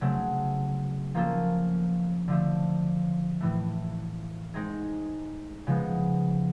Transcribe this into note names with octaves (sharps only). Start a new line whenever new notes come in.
C#3 F#3 A3 C4
F3 A#3 C#4 F4 A4
D3 F3 A3
A2 E3 A3
G#3 C4 D#4 G#4
C#3 F3 G#3 B3